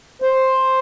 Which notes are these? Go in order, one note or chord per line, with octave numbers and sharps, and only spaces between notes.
C5